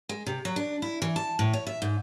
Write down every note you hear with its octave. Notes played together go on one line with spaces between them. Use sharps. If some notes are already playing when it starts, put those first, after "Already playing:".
G#3
C3
F#3
D4
E4
E3
A5
A2
C#5
E5
G#2